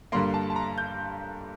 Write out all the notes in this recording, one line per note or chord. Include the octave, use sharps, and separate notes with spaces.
G2 D3 G3 A#3 C6
A5
A5
A#5
G6